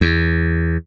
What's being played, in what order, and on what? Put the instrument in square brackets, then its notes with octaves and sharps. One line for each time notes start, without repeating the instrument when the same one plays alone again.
[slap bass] E2